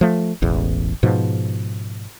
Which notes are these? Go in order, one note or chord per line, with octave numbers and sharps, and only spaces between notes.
F3 A3
E1 A1 E2
G#2 B2 F3